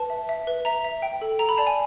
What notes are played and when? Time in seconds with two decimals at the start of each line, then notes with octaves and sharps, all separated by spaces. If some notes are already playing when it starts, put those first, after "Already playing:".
Already playing: B4 A5
0.10 E5
0.29 E5
0.47 B4
0.65 E5 A#5
0.85 E5
1.02 G5
1.22 A4
1.39 A4 A#5
1.49 B5
1.58 D5 A5
1.67 G#5